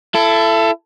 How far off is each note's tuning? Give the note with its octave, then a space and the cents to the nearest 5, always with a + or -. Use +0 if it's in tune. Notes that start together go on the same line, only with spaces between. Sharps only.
E4 +30 A4 +0